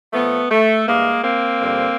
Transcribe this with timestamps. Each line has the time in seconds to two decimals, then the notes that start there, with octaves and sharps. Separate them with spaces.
0.13 A#2 F3 A3 B3
0.50 A3
0.87 G2 E3 G#3 A#3
1.24 A#3 C4
1.61 G2 D3 F3